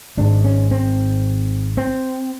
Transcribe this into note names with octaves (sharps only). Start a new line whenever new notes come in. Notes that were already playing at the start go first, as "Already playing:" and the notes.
G#1 G#2 D4
C#4
C4
C4